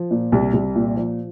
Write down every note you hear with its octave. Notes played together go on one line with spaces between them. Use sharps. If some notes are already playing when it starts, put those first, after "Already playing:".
Already playing: F3
A#2
C2
C2
A#2
F3